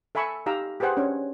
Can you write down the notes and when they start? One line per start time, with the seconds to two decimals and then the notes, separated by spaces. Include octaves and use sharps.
0.15 A4 E5 G#5 B5 C#6 E6
0.46 D#4 G4 F5 A#5 E6
0.80 G4 G#4 B4 C5 F#5 G5
0.97 C#4 D4 C#5